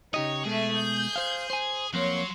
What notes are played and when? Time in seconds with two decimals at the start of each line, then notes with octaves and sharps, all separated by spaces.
0.14 C#3 D#4 G4 C#5 D#5
0.45 B2 G#3 A3 G#4 E5
0.76 G6
1.16 C5 F5
1.50 C5 G#5
1.94 F2 F#3 A#3 F#4 C#5 C6